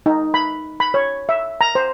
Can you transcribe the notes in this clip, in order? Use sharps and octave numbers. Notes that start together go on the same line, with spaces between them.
D#4
B5
B5
C#5
E5
A#5
C5